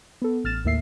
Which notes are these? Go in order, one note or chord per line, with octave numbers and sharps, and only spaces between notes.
B3 A4
A1 F6 A6 E7
D#2 A2 A#3 E5 C7